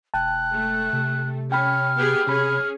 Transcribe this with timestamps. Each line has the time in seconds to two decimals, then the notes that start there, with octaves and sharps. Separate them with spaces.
0.14 E1 G5 A5 F#6
0.53 A3
0.93 C3
1.52 C#4 G5 B5 F6
1.97 B3 G4 G#4
2.27 C3 C#4 G#4 B5